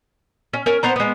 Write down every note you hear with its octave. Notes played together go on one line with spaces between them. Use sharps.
C#4
C#4 A#4
B3 C5 A#5
G#3 B3